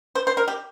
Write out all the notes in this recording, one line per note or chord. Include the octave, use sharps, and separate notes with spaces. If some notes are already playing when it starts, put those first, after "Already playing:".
C5
C5
A#4
G4